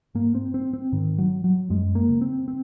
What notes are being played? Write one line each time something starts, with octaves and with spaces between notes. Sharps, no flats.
G#2 A#3
C4
C4
C4
G#2 D#3
F#3
F#3
F#2 G#3
A#3
C#3
C4
C4